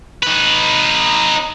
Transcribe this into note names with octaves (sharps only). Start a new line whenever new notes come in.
D#4 B4